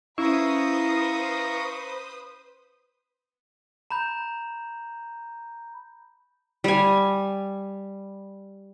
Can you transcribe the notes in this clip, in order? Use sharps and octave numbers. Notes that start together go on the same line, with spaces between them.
C#4 E4 B4 C5 F5 A#5 C#6 D#6
A#5 B5 G6
G3 G#5